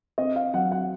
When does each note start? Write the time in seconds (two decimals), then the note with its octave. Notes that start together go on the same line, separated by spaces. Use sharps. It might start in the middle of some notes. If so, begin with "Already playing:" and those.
0.18 C4 D#5
0.36 F5
0.54 F#3 F#5
0.72 F#5